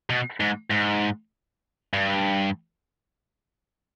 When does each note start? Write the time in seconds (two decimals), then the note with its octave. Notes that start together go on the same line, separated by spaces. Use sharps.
0.10 B2
0.40 G#2
0.71 G#2
1.93 G2